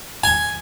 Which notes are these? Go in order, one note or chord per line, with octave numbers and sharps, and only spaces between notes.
G#5